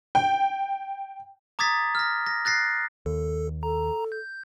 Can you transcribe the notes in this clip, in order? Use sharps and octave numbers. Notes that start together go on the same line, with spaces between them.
G5
A#5 D6 D#6 G#6 A6 B6
F6 A#6
A#6
F#6 A6 A#6 C7
D#2 A4
A4 A#5
G6